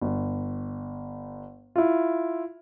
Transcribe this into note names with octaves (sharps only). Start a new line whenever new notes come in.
G1
E4 F4